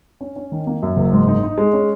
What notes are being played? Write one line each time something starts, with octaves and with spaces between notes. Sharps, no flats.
C#4
C#4
D#3
A#3
F#2
F#1
G#2
D#4
D#4
G#3
C#4